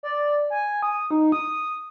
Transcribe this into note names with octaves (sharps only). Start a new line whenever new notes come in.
D5
G#5
D#6
D#4
D#6